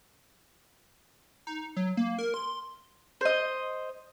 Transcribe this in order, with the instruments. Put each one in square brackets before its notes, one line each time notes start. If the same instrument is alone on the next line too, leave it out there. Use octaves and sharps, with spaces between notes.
[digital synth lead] D#4
F#3
A#3
A#4
C6
[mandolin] C5 D#5